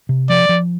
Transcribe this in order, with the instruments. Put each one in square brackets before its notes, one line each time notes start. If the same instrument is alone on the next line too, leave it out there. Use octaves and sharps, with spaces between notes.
[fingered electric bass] C3
[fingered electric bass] F3 [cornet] D5
[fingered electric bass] F3